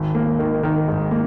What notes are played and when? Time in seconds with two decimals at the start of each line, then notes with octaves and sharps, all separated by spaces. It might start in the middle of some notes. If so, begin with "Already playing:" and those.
Already playing: G#1
0.15 A#3
0.39 D#3
0.63 D#3
0.88 G#2
1.11 A#3